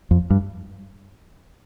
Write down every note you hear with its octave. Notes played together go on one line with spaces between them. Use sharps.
F2
G2